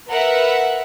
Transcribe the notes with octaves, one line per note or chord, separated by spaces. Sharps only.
A#4 B4 E5 F#5